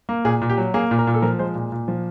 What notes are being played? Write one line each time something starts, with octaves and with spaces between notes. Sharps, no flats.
A#3
A#2 G#4
A#2
G4
F#3
A#3 G#4
A#2
A#4
A#2
A4
F3 A#4
G#3 C5
A#2
A#2
F3